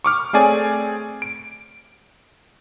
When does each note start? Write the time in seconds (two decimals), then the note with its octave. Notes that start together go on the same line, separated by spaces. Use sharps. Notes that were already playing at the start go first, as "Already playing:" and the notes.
0.04 C#6 D6 F6
0.33 A3 C4 G#4 C#5 D5 G#5
1.22 D7